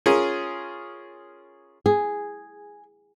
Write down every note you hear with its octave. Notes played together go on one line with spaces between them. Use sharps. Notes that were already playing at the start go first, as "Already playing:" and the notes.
C#4 F4 G#4 A#4
G#4